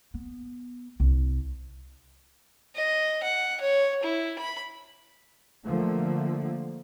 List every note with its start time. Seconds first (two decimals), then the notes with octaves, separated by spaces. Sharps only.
0.14 B3
1.00 C2
2.76 D#5
3.23 F#5
3.61 C#5
4.03 E4
4.39 B5
5.64 D3 F3 A3 A#3